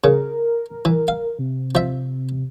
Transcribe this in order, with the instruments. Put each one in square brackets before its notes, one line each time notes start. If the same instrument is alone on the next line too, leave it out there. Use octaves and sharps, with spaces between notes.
[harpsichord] C#3 [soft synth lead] A#4
[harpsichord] E3
F5
[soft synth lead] C3
[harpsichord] F3 E5